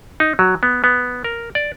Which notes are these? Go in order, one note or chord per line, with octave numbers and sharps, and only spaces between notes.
D#4
F#3
B3
B3
A#4
D5